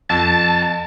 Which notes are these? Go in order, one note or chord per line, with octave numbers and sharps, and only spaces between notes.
F2 A5